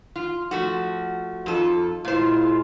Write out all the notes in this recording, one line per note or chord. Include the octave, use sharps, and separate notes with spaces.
F4
F3 A3 F#4
F2 D#4 F4 A4
A#2 G#3 E4 F4 C5